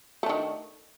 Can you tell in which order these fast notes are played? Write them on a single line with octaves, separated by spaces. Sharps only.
A3 D4 D#3